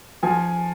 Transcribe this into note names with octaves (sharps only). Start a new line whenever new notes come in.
F3 G#5